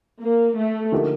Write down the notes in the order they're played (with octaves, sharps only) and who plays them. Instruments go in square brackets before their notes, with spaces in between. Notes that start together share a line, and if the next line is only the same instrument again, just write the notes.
[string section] A#3
A3
[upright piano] D3 F3 A#3 D#4 G4